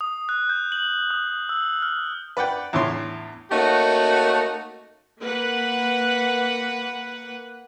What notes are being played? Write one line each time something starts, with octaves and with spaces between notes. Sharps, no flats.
D#6
F#6
G6
F#7
D#6
E6
F6
B4 D5 F#5 G5
E2 A2 D3 C#5 C6
A3 A#3 C#4 D#4 F#4
A#3 B4 F#5